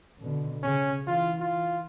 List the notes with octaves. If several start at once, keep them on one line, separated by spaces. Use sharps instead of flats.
B2 D3
C#3 C#4
E3 F4
F4